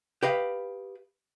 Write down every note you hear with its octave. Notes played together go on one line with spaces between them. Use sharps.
G4 B4 D#5 F5